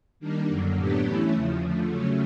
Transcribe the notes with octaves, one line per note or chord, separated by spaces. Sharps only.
D#3 G3 A#3 D4
F#2 D3 F#3 A#3
A2 F#3 B3 D4 G4
E3 A3 C#4 E4
E2 C#3 F3
D3 F3 A3
C#3 F#3 A3 C#4